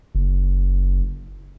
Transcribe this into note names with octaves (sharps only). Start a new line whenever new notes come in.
F#1